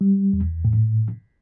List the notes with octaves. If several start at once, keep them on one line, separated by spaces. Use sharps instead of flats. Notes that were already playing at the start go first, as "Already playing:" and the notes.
G3
E2
A2